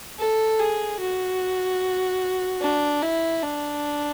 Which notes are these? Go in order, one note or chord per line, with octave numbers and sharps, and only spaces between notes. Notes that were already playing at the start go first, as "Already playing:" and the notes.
A4
G#4
F#4
D4
E4
D4